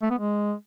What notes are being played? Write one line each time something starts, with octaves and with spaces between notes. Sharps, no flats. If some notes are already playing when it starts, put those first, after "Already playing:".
A3
B3
G#3